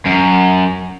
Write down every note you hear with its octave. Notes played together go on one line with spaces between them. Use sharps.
F#2